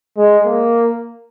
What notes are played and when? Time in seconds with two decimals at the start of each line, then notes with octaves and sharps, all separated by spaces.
0.17 G#3
0.46 A#3